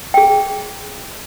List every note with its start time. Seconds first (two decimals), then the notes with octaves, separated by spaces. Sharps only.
0.14 G#4 G5